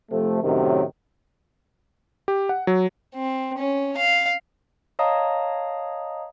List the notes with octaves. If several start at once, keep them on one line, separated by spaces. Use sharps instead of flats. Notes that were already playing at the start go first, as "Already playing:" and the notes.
C3 F3 A3
F#2 A2 C3 D#3
G4
F#5
F#3
C4
C#4
F5
C#5 D#5 F5 A5 A#5 D#6